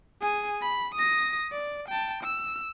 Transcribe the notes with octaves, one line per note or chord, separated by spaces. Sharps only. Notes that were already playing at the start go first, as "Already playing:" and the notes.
G#4 G#5
B5
D#6 A#6
D5
G5 A5
E6